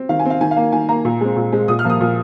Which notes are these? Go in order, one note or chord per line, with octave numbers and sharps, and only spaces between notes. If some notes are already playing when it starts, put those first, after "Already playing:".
Already playing: C4
D#3 F5
G#5
C4 F5
D#3 G#5
F5
A#3
D#3 G#5
A#3 A#5
A#2
G#3 C4
A#2
G#3 C4
A#2 D#6
F6
F3 A#3
D#6
A#2